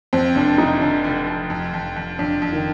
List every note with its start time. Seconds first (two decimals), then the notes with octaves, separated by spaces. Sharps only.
0.13 F2 C4
0.35 F1 D4
0.58 F1 D#4
0.81 F1 D4
1.04 F1
1.27 F1
1.50 F2
1.74 F2
1.96 F2
2.19 F2 D4
2.42 F2
2.53 D#3